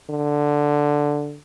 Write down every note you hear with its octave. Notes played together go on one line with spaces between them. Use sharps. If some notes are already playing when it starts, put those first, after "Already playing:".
D3